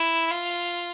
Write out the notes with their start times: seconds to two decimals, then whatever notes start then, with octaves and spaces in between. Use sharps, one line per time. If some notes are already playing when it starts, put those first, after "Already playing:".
Already playing: E4
0.31 F4